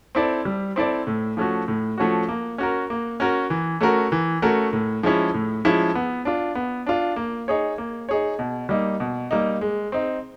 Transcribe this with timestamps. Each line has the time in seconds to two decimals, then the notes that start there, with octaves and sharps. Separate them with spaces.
0.15 C4 E4 A4 D5
0.45 G3
0.76 C4 E4 A4 D5
1.07 A2
1.37 F3 A3 C#4 F#4
1.68 A2
1.98 F3 A3 C#4 F#4
2.29 A#3
2.58 C#4 F#4 A#4
2.90 A#3
3.20 C#4 F#4 A#4
3.50 E3
3.81 A3 C#4 F#4 A#4
4.12 E3
4.42 A3 C#4 F#4 A#4
4.73 A2
5.03 F3 G#3 C#4 E4
5.34 A2
5.65 F3 G#3 C#4 E4
5.95 B3
6.25 D4 F4
6.55 B3
6.87 D4 F4
7.16 A#3
7.48 D#4 G#4 C#5
7.78 A#3
8.09 D#4 G#4 C#5
8.39 B2
8.69 G3 A#3 D#4
9.00 B2
9.31 G3 A#3 D#4
9.61 G#3
9.92 C4 D#4